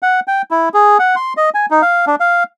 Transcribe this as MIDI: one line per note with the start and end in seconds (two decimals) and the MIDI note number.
0.02 0.20 78
0.28 0.42 79
0.51 0.69 64
0.74 0.98 68
0.99 1.16 78
1.16 1.33 84
1.37 1.50 75
1.54 1.66 80
1.71 1.82 63
1.82 2.05 77
2.07 2.16 62
2.20 2.43 77